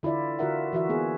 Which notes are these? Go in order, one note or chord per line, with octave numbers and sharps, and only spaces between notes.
D3 E4 F4 D5 E5
D3 F4 F#4 A#4 E5 F#5
E3 F#4 E5
A#3 B3 G#4